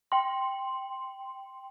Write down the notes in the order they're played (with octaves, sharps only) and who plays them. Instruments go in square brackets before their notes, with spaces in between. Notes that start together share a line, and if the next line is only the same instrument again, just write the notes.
[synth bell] G5 C6